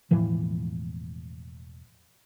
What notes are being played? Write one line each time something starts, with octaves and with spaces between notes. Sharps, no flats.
E1 A2 E3 F3